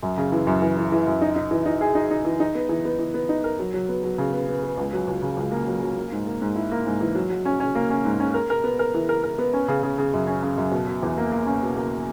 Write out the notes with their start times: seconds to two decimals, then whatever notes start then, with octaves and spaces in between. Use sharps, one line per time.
0.03 F#2
0.18 C#3
0.32 E3
0.47 F#2
0.62 E3
0.77 E3
0.92 E3
1.07 F#2
1.22 D#4
1.36 D#4
1.51 E3
1.66 D#4
1.81 G#4
1.95 D#4
2.11 D#4
2.25 E3
2.40 D#4
2.55 B3
2.69 E3
2.85 B3
2.99 E3
3.14 B3
3.29 D#4
3.44 A#4
3.59 F#3
3.74 F#3
3.89 B3
4.04 F#3
4.18 C#3
4.33 B3
4.49 B3
4.63 B3
4.77 C#2
4.93 F#3
5.07 C#2
5.22 C#3
5.37 C#2
5.52 A#3
5.67 F#3
5.82 F#3
5.96 A#3
6.12 G#2
6.27 A#3
6.41 G#2
6.56 E4
6.72 A#3
6.86 G#2
7.01 E3
7.15 F#3
7.30 F#3
7.45 C#4
7.60 C#4
7.75 A#3
7.90 C#4
8.05 G#2
8.20 C#4
8.34 A#4
8.50 A#4
8.64 B3
8.79 A#4
8.94 E3
9.09 A#4
9.23 A#4
9.38 B3
9.53 C#4
9.68 C#3
9.83 C#3
9.98 C#3
10.13 F#2
10.27 C#4
10.42 C#3
10.57 F#2
10.72 B2
10.87 B2
11.02 E2
11.17 A#3
11.32 A#3
11.46 C#4
11.62 B2
11.77 A#3